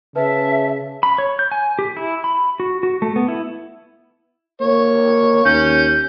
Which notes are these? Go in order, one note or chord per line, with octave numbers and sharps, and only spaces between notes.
C#3 B4 E5 A5
B5
C#5
G6
G#5
G4
E4
B5
F#4
F#4
A3
B3
E4
A#3 C#5
D#2 C#4 G6